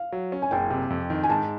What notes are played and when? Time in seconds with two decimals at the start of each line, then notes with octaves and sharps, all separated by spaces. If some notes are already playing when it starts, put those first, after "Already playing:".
Already playing: F5
0.12 F#3
0.32 C#4
0.42 G#5
0.51 F#1 G5
0.70 C3
0.90 F2
1.10 D#3
1.23 G#5
1.29 G#2 A5